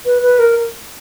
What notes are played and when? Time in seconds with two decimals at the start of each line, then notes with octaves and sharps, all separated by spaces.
0.06 B4
0.22 B4
0.39 A#4